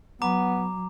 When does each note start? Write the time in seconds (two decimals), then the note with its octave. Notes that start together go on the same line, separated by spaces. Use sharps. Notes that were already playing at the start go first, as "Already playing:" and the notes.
0.22 F#3 B3 A#5 D6